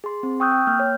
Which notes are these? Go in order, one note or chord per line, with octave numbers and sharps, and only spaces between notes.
G#4 C6
C4
G5 C#6 D#6 E6 F#6 G6
G5
A#3 F6 G6
C#5